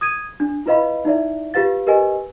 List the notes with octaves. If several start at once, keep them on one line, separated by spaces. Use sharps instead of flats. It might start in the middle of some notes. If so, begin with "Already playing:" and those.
D#6 G#6 D#7
D4
E4 F4 B4 D#5 F5 B5
D#4 E4 D5 E5
F4 G4 B4 F5 A6
G4 A#4 B4 D#5 G#5